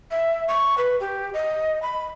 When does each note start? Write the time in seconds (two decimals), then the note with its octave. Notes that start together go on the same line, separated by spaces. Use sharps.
0.11 E5
0.48 C#6
0.78 B4
1.00 G4
1.34 D#5
1.82 B5